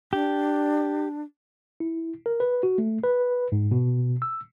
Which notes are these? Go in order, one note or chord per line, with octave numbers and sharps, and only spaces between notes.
D4 G4
E4
A#4
B4
F#4
A3
B4
G#2
B2
E6